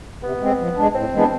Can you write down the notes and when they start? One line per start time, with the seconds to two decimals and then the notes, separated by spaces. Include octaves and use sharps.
0.23 C3 B3
0.41 G#3 C4
0.59 F3
0.77 G#3 D4
0.95 A2 C4
1.13 E3 G#3 B3 D4